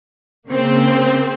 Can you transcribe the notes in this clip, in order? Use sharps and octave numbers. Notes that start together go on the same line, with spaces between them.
C#3 A#3 C4